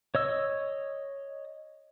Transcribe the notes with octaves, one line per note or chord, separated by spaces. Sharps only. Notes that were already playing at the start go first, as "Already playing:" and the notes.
C#5 D#5 E6